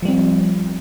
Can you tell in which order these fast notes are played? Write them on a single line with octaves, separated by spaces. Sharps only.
F3 G3 C4